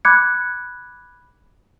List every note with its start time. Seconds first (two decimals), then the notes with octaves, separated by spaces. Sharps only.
0.05 B5 D6 F#6 G#6 C#7